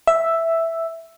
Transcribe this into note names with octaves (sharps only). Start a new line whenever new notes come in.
E5